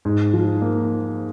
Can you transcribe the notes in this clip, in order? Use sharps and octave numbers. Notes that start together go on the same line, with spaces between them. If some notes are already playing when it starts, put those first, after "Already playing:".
G#2
F3
A#3